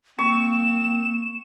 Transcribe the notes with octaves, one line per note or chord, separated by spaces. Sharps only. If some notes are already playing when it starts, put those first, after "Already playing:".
A#3 C4 C#6 E7